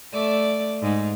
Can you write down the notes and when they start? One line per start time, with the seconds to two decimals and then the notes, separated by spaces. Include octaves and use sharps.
0.13 A3 D5
0.82 G#2